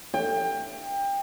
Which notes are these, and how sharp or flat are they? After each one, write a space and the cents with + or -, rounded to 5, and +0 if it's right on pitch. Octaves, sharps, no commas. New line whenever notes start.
G5 +25